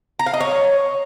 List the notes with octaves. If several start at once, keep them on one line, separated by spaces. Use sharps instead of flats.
A#5
F5
D#5
C#5